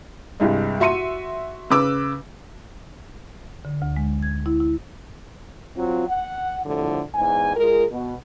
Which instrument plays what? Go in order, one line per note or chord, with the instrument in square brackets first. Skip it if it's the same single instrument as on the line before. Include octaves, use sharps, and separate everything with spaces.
[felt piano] C2 G2 G#3
F#4 E5 C6 C#7 D#7
C#3 B4 D6 E6
[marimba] D3
D2
G#3
G#6
E4
E4
[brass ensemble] F#3 C4 F4
F#5
C2 A2 D3 F3
E2 G#2 G#5
G#3 F4 G#4 A#4
B2